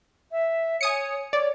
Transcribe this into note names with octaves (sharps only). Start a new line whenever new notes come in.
E5
C#5 G#5 D#6 C#7
C#5 D5